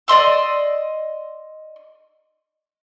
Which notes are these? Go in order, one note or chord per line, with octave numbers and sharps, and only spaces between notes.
D5 D#5 C6 E6